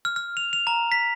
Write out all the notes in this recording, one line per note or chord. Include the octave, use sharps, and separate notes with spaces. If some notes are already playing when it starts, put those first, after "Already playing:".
F6
F6
F7
F7
A#5
B6